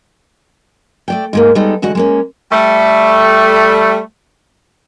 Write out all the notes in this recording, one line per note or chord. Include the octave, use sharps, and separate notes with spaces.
A3 D5 G5
G#2 G#3 A#3
G3 G#3 B3 D#4 A4
E2 D3 G#3 F#4 F#5
G#3 A#3 C#4
G3 A3